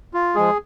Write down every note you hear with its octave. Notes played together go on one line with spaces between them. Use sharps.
F4
F3 G#3 G#4